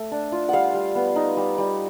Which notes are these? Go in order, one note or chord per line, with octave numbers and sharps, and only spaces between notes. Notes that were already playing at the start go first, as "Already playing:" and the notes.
Already playing: A3
D4
F4
G3 F5 F#5
G3
B3
D#4
G3
G3